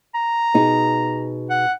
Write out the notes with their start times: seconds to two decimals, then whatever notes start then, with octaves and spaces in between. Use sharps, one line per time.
0.15 A#5
0.54 B2 D#4 G#4
1.50 F#5